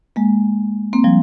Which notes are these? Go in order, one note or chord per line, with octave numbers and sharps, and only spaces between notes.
G#3 A#3
A#3 C4
F3 G3